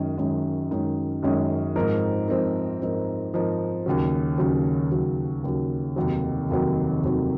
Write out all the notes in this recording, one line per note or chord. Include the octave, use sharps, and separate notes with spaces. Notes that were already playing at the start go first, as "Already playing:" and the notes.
Already playing: F#2 D#3 G#3 C#4
F#2 D#3 G#3 C#4
F#2 D#3 G#3 C#4
F#2 D#3 G#3 C#4
G#2 F3 C4 D#4 A#4
G#2 F3 C4 D#4 A#4
G#2 F3 C4 D#4 A#4
G#2 F3 C4 D#4 A#4
D#2 C#3 F#3
D#2 C#3 F#3
D#2 C#3 F#3
D#2 C#3 F#3
F1 D#2 D#3 F#3
F1 D#2 D#3 F#3
F1 D#2 D#3 F#3